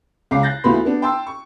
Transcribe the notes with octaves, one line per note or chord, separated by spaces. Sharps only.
C#2 C#3 A#5 D6 C7
F#6 G6 A6 A#6
D2 E3 F3 B3 B5 C6
B3 D4
G5 A5 C6 E6
C#6